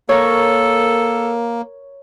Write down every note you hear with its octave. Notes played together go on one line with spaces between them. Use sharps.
A#3 A4 A#4 C#5